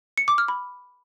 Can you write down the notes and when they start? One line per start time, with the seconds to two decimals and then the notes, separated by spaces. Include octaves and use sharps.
0.18 C#7
0.28 D6
0.38 F6
0.48 B5